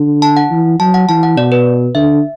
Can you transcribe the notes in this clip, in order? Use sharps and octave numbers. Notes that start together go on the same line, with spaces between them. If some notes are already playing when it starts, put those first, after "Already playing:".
Already playing: D3
A5
F#5
E3
F#3 A5
F#5
E3 A5
F#5
B2 D5
B4
D3 E5